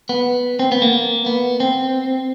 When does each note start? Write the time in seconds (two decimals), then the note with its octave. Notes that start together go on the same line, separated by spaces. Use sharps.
0.09 B3
0.59 C4
0.72 B3
0.82 A#3
1.26 B3
1.60 C4